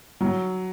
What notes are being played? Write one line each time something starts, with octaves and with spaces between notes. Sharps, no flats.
F#3